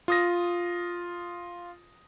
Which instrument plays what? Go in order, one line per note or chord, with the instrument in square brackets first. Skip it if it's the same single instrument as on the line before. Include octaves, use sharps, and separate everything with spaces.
[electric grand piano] F4 D#6 A#6